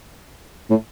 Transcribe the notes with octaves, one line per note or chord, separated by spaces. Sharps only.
A2